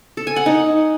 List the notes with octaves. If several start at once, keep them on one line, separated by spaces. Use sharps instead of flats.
A4
G#5
F#5
D#4